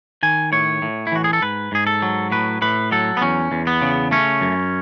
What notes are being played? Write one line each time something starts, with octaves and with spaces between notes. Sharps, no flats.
D#3 G#5
A2 C#5
A2
E4
E3 F#4
G#4
A4
G#2 B4
G#2 G#4
A4
F#3
A2 B4
A2 B4
F#3 A4
B3
E2 C#4
E2
B3
C#3
A3 C#4
F#2